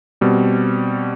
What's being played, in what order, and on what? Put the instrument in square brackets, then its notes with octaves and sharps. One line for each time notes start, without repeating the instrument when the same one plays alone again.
[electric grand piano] B2 G3 C4